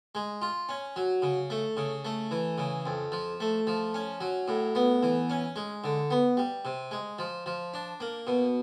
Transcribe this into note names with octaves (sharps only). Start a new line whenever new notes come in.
G#3
F4
C#4
F#3
C#3
A3
C#3
A3
E3
C#3
F2
F3
A3
F3
C#4
F#3
A2
B3
E3
C#4
G#3
D3
B3
G3
C3
G#3
F3
F3
D4
A#3
B2